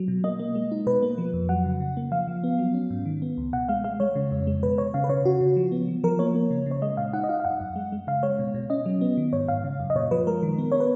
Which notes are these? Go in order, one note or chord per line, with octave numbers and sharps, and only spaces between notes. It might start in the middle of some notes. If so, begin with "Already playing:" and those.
Already playing: F#3
B2
A#3 D#5
A#3
G#3
D#4
B2 B4
A#3
F3
F2
F#3 F#5
C#3
C#3
A#3
F3 F5
F3
B3
F#3
C#4
G#2
D#3
B3
C#2
B2 F#5
G#3 F5
G#3 F5
G#3 C#5
C#3
F2
G#3
B2 B4
B2 C#5
C#3 F5
B4
C#3 C#5
C#3 F#4
C#3
F3
B3
F3
F3 A#4
A#3 C#5
A#3
C#3
C#3
C#5
G#3 D#5
A#2 F5
D#4 F#5
D#5
D#4 F5
F5
F#2 F#5
F#2
G#3
G#3
C#3 F5
G#3 C#5
B2
B2
C#4 D#5
F#3
B3
D#3
G#2 C#5
G#2 F5
C#3
F#2
D#5
A#2 C#5
F3 B4
G#3 A#4
D#3
B3
B3 C#5
B4